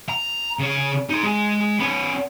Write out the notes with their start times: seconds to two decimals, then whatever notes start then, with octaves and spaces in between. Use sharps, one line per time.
0.09 A#5
0.59 C#3 C#4
1.09 D#4 C6
1.23 G#3
1.80 B3 C#4